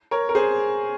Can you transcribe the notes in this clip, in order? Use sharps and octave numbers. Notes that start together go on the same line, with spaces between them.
A#4 C#5
A#4
G#4 C5